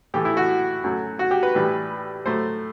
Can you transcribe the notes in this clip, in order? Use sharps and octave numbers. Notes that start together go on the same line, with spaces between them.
A2 E3 A3 G4
E4
F#4
F#2 F#3 A3
F#4
G4
B4
A2 E3 G3
A2 F#3 A3 C5